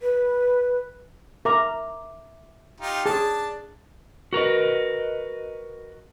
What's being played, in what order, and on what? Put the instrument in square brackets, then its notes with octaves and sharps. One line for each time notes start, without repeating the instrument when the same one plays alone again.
[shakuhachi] B4
[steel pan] A#4 A#5 [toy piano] E5 D6
[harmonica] D#4 F4 G4
[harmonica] D4 A5 [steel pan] G#4
[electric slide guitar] F#4 A#4 B4 D#5